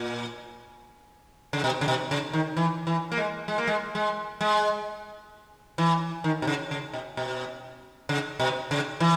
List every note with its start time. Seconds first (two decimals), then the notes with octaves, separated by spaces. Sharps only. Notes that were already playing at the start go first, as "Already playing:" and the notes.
Already playing: A#2
1.53 C#3
1.64 B2
1.81 C#3
1.88 B2
2.11 C#3
2.33 D#3
2.57 E3
2.87 E3
3.12 A#3
3.18 G#3
3.48 G#3
3.58 A#3
3.67 G#3
3.95 G#3
4.41 G#3
5.78 E3
6.24 D#3
6.42 B2
6.47 C#3
6.71 C#3
6.93 B2
7.17 B2
8.09 C#3
8.40 B2
8.71 C#3
9.00 E3